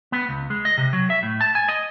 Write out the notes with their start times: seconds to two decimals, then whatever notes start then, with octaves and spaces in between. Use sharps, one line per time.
0.12 B3
0.29 C#2
0.50 G#3
0.65 D#5
0.78 C3
0.93 F#3
1.10 E5
1.23 A2
1.41 A5
1.55 G#5
1.68 D#5